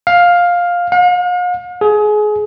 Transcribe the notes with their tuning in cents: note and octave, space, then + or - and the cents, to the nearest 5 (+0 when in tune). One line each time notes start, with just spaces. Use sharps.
F5 +10
F5 +45
G#4 +25